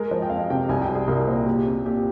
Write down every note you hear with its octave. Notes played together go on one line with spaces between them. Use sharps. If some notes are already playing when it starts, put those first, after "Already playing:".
Already playing: G#3 A#4
F3 C5
G5
F2 F5
C3 G5
C2 G#5
G5
G3
G#4
C2 A#4
A#2 C5
A#2 G4
C4
A#2 G4